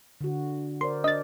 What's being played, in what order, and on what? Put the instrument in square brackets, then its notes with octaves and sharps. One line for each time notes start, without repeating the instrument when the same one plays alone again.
[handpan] D3 F#4
[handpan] A#4 C5 D5 [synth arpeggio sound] C6
[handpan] D4 D5 [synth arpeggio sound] D#5 A6